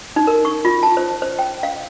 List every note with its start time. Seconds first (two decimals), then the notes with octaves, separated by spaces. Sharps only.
0.16 D#4
0.27 A#4
0.45 C#6
0.65 F4
0.83 A5
0.97 C5
1.22 C5
1.39 G5
1.63 F5